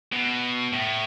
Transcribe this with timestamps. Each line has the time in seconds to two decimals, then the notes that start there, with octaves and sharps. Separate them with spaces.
0.13 B2
0.73 A2